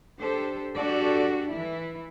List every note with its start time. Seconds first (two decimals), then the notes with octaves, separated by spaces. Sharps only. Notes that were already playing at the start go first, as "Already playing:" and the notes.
0.19 D4 G4 A4 C5
0.74 D4 F#4 G4 A4 D5
1.52 E3 E4